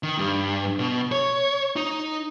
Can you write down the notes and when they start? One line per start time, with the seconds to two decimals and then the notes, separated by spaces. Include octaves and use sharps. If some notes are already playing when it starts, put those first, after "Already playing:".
0.03 D#3
0.18 G2
0.79 B2
1.12 C#5
1.76 D#4